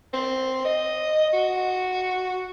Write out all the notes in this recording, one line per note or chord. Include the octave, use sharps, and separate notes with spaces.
C4
D#5
F#4